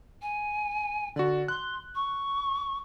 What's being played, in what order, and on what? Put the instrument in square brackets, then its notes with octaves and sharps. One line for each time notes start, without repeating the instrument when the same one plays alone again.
[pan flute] G#5
[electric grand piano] D3 F#4 [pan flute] D5
[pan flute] C6 [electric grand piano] F#6
[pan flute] C#6